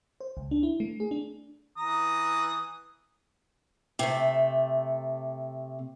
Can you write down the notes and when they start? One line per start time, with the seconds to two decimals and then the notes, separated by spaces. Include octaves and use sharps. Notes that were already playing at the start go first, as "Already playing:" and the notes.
0.21 C5
0.37 C#2
0.51 D4
0.63 E4
0.80 A3
1.00 G#4
1.11 D4
1.77 E3 A#5 D#6
3.99 C3 A3